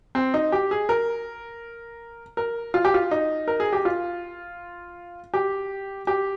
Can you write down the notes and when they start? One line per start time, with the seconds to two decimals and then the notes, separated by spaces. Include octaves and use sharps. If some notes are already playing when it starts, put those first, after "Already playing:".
0.15 C4
0.34 D#4
0.52 G4
0.71 G#4
0.89 A#4
2.37 A#4
2.74 F4
2.85 G4
2.94 F4
3.11 D#4
3.48 A#4
3.60 G#4
3.73 G4
3.85 F4
5.34 G4
6.07 G4